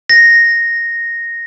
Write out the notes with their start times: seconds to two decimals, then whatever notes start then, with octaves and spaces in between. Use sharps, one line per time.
0.10 A#6